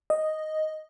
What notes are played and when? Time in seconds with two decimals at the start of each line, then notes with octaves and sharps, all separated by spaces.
0.10 D#5